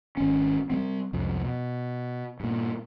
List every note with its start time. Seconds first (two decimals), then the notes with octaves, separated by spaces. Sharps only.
0.17 G#1 C#4
0.70 G3 A3 C4
1.13 C2 F2 G#2
1.45 B2
2.40 G2 A#2